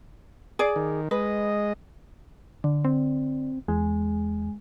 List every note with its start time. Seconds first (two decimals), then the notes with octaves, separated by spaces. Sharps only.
0.59 G#4 D5
0.76 D#3
1.11 G#3 B4 D#5
2.64 D3
2.85 C4
3.68 E2 G#3